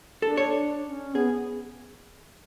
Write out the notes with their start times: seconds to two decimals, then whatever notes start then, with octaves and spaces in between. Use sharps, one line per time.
0.22 D4 A4
0.37 C#5
0.84 C#4
1.15 B3 G#4